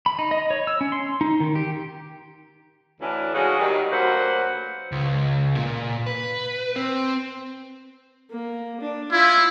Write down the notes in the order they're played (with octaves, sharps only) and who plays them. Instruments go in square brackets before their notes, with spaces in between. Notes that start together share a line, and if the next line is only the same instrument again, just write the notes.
[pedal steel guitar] B5
D#4
D#5
C#5
E6
C#4
C6
D#4
D#3
G4
[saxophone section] D2 E3 C#4 D4
C#3 G#3 C#4 D#4 F#4
D#3 F#3 G3
D2 F#3 A#3 B4 C5 F#5
[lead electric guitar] C#2
A#2
B4
C4
[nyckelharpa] A#3
D4
[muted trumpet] E4 [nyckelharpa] F4